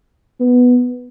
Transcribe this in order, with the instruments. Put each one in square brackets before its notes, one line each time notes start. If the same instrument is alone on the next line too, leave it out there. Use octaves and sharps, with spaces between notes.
[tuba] B3